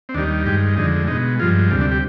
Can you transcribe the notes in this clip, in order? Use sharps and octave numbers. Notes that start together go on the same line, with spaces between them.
C4
D#2 D#3 G3 D4
G2 D#3 G#3 G4
F2 D3 G#3 D#4
B2 G#3 D#4
G2 F3 G#3 F4
D2 C3 G3 F4
D4
G4